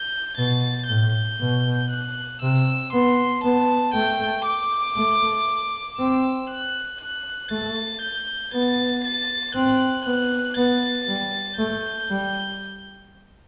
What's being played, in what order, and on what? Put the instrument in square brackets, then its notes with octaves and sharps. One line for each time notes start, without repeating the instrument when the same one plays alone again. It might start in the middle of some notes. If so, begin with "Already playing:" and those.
Already playing: [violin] G6
[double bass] B2 [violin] A6
[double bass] A2 [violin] G6
[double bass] B2
[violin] F#6
[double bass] C3 [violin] E6
[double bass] B3 [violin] C6
[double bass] B3 [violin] A5
[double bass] A3 [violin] G5
[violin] D6
[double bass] A3
[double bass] C4 [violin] E6
[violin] F#6
F#6
[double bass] A3 [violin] A6
[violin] G6
[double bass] B3 [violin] A6
[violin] A6
[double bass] C4 [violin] F#6
[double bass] B3 [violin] F#6
[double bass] B3 [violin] A6
[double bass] G3
[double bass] A3 [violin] G6
[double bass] G3